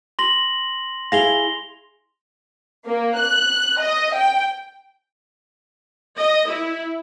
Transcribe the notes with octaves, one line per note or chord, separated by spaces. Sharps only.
C6 A#6 F#7
E4 G#4 F5 A#6 F7 G7
A#3
F#6
D#5
G5
D#5
E4